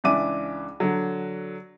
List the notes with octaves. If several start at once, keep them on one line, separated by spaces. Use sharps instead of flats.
C#2 E3 D4 E5 D6 D#7
D3 F#3